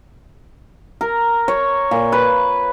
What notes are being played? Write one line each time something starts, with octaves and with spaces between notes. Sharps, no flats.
A#4
C#5
A#2
B4